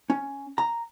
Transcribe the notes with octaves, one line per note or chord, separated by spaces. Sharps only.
C#4
A#5